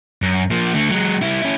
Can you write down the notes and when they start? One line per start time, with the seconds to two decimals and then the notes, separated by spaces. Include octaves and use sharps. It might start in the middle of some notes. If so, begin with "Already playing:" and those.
0.22 F#2
0.51 F3 A#3
0.75 D3 A3
0.90 F#3 G#3
1.22 G3 E4
1.42 C#4 E4